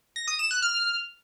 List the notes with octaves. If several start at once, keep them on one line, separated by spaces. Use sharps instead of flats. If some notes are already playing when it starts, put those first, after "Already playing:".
A#6
D#6
E7
F#6
F6